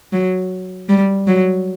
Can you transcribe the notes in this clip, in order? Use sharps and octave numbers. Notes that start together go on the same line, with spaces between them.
F#3
G3
F#3